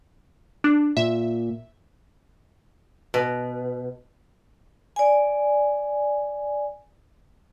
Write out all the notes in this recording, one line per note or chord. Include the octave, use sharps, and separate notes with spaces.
D4
A#2 E5
B2
D5 G#5